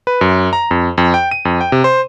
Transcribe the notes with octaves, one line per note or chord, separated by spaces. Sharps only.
B4
F#2
A#5
F2
F2
G5
D#7
F2
G5
C3
C5